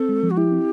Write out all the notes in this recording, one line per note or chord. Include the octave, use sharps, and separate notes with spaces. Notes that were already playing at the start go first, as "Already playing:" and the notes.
Already playing: C4 A4
G#3
F3
F#4
E4 G4
C4